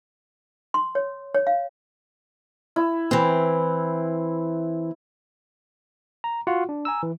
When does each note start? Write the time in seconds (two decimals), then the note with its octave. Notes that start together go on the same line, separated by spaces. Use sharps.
0.74 C6
0.95 C#5
1.34 C#5
1.47 F5
2.76 E4
3.11 E3 C4
6.24 A#5
6.47 F4 F#4 F#5
6.69 D4
6.85 G#5 A#5 E6
7.03 E3